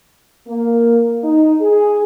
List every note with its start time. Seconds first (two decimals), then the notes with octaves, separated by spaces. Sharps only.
0.47 A#3
1.24 D#4
1.60 G#4